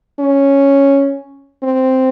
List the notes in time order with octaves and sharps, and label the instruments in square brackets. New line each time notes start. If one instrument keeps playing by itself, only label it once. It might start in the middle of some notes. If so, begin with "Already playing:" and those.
[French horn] C#4
C4